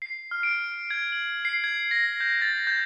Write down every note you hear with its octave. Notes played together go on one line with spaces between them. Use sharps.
C7
F6
D7
G#6
F#7
C7
G#6
A#6
G6
A6
G6